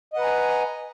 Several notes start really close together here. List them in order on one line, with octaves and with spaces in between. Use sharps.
D#5 F#5 B4 A#5 G#5